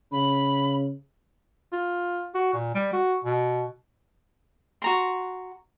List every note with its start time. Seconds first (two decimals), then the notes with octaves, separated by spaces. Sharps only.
0.12 C#3 B5
1.73 F4
2.34 F#4
2.53 A#2
2.75 G3
2.93 F#4
3.24 B2
4.82 F#4 A#5 C6